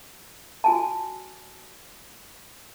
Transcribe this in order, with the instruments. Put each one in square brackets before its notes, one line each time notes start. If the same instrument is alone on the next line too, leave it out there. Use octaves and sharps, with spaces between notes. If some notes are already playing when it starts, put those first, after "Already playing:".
[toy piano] F#4 G#5 A5